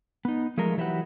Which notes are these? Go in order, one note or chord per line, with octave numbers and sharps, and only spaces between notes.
B3 D#4
F3 G#3 A3 F4 A#4
E3 F#3 E4 G4 B4 F#5